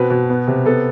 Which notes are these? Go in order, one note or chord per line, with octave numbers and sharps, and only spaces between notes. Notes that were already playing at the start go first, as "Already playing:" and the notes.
Already playing: B2 C4 B4
B2
B3
C3
B3 A4